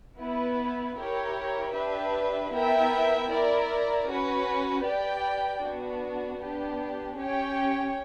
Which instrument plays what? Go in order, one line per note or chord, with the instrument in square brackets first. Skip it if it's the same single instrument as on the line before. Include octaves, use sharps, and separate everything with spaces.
[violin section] B3 E4 B4
E4 G4 A#4 C#5
D4 G4 B4 E5
B3 E4 A#4 E5 G5
E4 A#4 D5
C#4 F#4 B4
G4 B4 D5 G5
B3 D4 F#4
B3 D4 G4
C#4 G4 C#5 G5